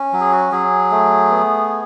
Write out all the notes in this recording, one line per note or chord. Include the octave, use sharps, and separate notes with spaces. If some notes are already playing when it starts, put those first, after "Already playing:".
Already playing: C#4
F#3
G#4
F#4
F#3 G#4
A3
B3